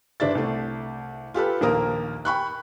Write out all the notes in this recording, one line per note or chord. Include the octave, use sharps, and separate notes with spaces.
G1 D4 E5 A6
C2 A3
F4 G4 A4 B4
A#1 D#2 A#3 A#4 A#5 D#6
G5 B5 C#6 F#6